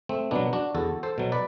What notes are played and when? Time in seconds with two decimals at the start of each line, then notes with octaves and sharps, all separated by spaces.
0.09 A3 C4
0.31 B2 F#3 B3 D4
0.53 D4 F#4
0.75 E2 F#4 A4
1.03 A4 C5
1.18 B2 F#3
1.32 B4 D5